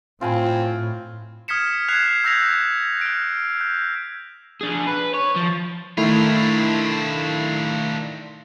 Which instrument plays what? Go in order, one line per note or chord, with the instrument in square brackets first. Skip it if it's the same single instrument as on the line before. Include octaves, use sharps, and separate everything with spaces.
[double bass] A2 [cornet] C4 [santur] F4 G#5 B5
[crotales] D#6 F6 G#6 B6 C#7 E7
F#6 G#6 C7 F7
E6 G6 G#6 A#6 B6 F7
F6 D7
G6
[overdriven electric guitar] D4 G#4
B4
C#5
F3
[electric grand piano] D#3 A3 E4 [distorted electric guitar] D4 F4